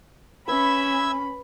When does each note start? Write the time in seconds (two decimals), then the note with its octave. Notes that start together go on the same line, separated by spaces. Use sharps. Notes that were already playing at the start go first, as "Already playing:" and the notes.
0.48 C#4 B4 E5 B5 E6 G#6